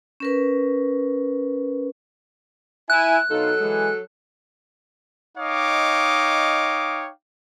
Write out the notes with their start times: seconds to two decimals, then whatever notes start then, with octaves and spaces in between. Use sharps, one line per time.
0.20 C#4 A#4 B4
2.90 E4 G#5 F#6
3.30 B2 F#3 D#4 F4 A4
3.61 E3 G#3 G#4
5.38 D#4 C#5 D#5 F5 G5 D6